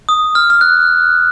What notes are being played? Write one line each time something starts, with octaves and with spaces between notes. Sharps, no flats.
D#6
F6
F6
F#6